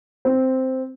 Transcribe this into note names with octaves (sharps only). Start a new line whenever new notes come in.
C4